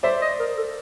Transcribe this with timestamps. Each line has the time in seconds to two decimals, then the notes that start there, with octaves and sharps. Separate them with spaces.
0.03 C5 D5 E5
0.21 D#5
0.39 A#4
0.57 A4